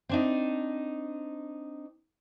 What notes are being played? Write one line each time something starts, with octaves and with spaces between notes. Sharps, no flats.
C4 D4 D#4